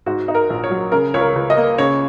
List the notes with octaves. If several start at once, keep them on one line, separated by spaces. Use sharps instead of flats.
G#2 F#4
D#4
A#4
A#1
C#5
F#3
C#3 A#4
C#2 C#5
A#4
C#2
D#5
A#3
C#3 C#5